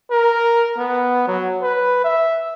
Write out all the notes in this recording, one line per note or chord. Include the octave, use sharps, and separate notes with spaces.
A#4
B3
F#3
B4
E5